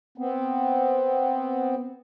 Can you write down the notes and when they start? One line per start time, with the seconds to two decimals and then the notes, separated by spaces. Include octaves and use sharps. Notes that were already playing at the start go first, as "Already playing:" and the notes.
0.18 B3 C4